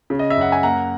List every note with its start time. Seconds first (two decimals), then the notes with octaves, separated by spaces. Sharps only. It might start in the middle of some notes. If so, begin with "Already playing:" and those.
0.10 C#3
0.19 D#5
0.30 E5
0.37 F#2 F#5
0.52 G#5
0.63 A#3 F#5 A#5